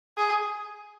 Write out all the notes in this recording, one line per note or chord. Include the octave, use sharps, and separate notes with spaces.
G#4